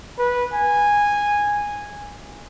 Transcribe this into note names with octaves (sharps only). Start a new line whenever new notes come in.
B4
G#5